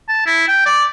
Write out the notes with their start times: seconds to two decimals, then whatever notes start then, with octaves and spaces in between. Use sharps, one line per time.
0.09 A5
0.26 E4
0.48 G5
0.66 D5